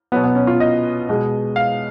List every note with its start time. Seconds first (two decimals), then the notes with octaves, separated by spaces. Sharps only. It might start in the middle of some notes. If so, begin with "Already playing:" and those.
0.12 F#3 B3
0.16 B2
0.24 B3
0.35 C#4
0.47 F4
0.60 D#5
1.09 B2 G#3
1.56 F5